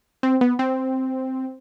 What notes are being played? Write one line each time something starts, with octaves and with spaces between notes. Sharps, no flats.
C4
B3
C4